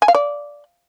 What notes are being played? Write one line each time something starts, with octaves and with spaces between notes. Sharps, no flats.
G#5
F5
D5